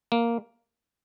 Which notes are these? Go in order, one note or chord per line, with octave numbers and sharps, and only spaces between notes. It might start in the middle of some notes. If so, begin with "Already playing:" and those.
A#3